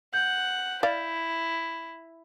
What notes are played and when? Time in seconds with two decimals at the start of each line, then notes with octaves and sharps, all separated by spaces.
0.14 F#5 G6
0.83 E4 D5 F5